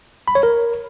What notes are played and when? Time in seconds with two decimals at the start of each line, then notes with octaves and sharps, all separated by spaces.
0.28 B5
0.35 C#5
0.43 A#4